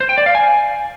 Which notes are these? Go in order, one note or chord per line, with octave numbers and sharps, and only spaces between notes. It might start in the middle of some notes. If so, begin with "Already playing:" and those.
C5
G5
D5
F5
G#5